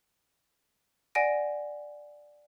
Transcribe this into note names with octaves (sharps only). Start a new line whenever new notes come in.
D5 F#5 G#5 A#6 D7